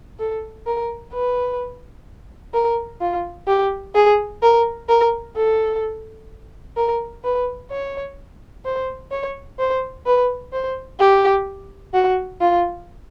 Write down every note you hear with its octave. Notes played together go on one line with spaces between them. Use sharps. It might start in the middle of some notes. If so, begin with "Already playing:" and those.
A4
A#4
B4
A#4
F4
G4
G#4
A#4
A#4
A4
A#4
B4
C#5
C5
C#5
C5
B4
C5
G4
F#4
F4